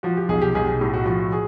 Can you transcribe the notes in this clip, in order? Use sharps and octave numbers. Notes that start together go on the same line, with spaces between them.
F3 F#4
G4
B1 G#4
G4
B1 G#4
G#4
A2 G4
F#4
F3 F#4
G#4